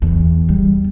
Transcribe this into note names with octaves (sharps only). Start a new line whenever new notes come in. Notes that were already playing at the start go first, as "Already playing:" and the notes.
E2
G3